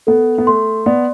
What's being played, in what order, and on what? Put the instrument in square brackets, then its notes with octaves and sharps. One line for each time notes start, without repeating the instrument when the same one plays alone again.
[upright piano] B3 [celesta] A4
[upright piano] B3
[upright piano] A3 [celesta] C6
[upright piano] B3 [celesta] D5